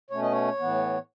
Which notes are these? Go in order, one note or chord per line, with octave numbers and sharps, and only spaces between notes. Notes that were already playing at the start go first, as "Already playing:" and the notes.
B2 A3 C#4 C#5
D#5
C#5
A2 E3 B3